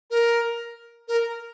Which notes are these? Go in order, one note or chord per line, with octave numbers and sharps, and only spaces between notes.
A#4
A#4